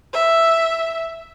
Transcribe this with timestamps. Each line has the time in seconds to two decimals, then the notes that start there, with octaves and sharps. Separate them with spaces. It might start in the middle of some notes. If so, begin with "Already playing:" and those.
0.13 E5